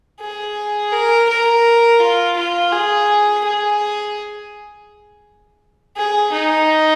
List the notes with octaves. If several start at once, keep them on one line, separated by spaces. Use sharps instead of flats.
G#4
A#4
A#4
F4
F4
G#4
G#4
G#4
D#4